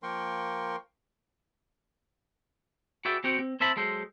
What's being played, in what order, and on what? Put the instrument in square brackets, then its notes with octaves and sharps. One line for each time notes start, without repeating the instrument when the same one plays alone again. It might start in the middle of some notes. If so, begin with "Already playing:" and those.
[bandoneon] F3 A#3 A#4 G5 C6 C#6
[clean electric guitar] F#4 G#4 B4 D5 E5 G5
C4 F#4 G4 C5 F#5 G5
C4
C4 C5 E5 A5 B5
F#3 G#3 A4 C5